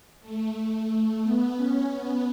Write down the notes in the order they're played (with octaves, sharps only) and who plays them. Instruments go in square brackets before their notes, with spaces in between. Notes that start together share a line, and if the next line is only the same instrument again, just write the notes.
[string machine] A3
B3
C#4
B3